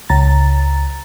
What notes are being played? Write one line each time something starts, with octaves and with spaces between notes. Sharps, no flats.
C#2 A#5 A6